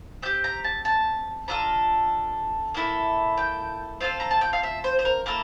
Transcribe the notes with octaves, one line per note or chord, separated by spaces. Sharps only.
C4 G4 G6
A#5
A5
A5
D4 F4 A4 A#5
A#3 E4 A4
G5
C4 F4 A4 F5
A#5
A5
G5
F5
E5
C5
C5
A#4
A#3 E4 A4 A#4